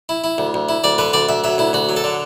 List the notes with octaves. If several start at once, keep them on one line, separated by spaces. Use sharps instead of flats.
E4
E4
D2
D2
E4
D2 D5
D3 B4
D2 D5
D2 E5
F#3 E5
D2 E4
D2 F#4
F#3
A4
D3